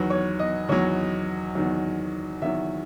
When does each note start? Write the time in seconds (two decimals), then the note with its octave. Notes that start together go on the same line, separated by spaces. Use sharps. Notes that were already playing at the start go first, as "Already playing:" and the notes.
Already playing: E2 D#3 F#3 B4
0.10 C#5
0.39 D#5
0.69 E2 D#3 F#3 C#5
1.55 E2 D#3 F#3
2.42 E2 D#3 F#3 E5